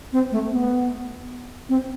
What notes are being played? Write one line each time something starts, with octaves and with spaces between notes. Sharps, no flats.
C4
A3
B3
C4